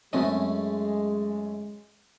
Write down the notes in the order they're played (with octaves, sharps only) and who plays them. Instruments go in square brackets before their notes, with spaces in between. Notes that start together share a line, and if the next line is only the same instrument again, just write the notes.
[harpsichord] F#2 A3 C#4 [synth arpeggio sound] F#3 C4 D#5 [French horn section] G#3